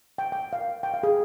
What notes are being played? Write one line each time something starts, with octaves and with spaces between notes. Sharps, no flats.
G5
G5
F5
G5
F5
G#4